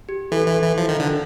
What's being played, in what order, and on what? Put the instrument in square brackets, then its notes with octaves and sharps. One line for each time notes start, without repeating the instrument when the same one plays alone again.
[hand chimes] G4
[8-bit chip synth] E3 [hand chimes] A4
[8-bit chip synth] E3
E3
F3
D#3
D3